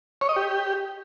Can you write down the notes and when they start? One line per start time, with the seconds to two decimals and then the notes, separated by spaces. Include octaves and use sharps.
0.21 C#5
0.29 D#5
0.36 G4